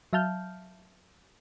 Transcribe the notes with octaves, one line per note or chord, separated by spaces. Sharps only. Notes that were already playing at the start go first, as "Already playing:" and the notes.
F#3 E5 F5 A5 F6 G6